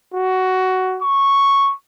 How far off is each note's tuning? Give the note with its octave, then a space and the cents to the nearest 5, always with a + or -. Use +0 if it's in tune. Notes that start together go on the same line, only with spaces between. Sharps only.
F#4 +10
C#6 -5